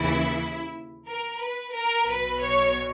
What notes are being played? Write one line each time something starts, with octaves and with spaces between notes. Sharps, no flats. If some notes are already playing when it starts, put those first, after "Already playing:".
Already playing: D#2 C#3 E3 E4
A#4
B4
A#4
B1 B2 B4
C#5